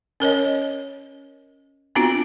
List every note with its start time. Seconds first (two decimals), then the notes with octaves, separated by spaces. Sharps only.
0.20 C#4 A#4 C#5 D#5
1.95 B3 C4 D4 F4 F#4